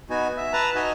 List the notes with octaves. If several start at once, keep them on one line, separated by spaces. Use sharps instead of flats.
B3 D#4 F#4 G#5
E5
B4 A5 A#5
D#4 F#4 D#5 G#5